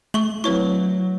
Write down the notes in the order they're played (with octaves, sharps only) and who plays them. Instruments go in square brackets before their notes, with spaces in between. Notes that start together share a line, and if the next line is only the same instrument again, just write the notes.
[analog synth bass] A3 [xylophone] C#6 F#7
[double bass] F#3 [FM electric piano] C4 E4 [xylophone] B4 C#5 C#6